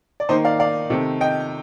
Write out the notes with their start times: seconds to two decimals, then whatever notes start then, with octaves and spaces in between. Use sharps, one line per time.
0.20 D5
0.29 D#3 A#3 D#4 C5 D#5
0.45 D5 F5
0.60 D5 F5
0.90 C3 D#3 A3
1.21 D#5 G5